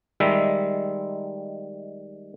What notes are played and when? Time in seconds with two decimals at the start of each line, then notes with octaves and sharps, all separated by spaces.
0.20 D#3 G3 G#3 E5